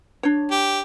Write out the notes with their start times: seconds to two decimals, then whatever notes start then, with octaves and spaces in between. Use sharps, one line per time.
0.23 D4 C#5
0.51 G4